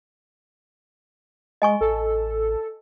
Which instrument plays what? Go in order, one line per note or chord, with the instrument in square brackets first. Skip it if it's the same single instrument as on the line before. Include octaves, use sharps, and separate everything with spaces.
[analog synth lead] G#3 [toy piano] D#5 G#5 C#6
[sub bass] A1 [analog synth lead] A4